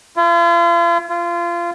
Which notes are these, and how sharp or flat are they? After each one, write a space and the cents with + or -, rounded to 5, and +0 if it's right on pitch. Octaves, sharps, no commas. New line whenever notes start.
F4 -40
F4 -25